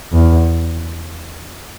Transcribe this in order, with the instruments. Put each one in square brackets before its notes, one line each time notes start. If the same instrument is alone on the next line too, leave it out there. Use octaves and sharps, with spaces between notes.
[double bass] E2